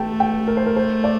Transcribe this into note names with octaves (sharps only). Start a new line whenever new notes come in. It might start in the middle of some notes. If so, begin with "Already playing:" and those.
Already playing: A3 G5 A5
G5
A#4
C5
A#4
C5
D5